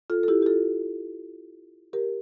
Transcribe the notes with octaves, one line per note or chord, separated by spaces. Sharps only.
F4 A4
A4
E4 G4
G4
F4 A4
G4 A#4